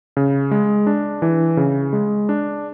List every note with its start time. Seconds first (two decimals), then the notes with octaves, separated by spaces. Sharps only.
0.17 C#3
0.51 G#3
0.87 D4
1.22 E3
1.57 C#3
1.93 G#3
2.29 D4